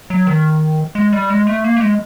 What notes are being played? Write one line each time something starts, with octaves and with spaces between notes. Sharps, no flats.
F#3
D#3
G#3
G3
G#3
A3
A#3
A3
G#3